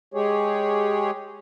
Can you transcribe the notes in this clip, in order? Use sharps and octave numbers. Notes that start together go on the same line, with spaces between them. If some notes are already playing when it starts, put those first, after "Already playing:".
G#3 G4 G#4 C#5